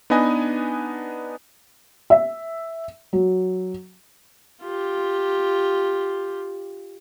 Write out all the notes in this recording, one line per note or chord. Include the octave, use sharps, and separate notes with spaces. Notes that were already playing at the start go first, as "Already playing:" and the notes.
B3 D4 D#4 B4 D#5 G#5
E5
F#3
F4 G4